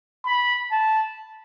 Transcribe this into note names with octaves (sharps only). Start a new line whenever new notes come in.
B5
A5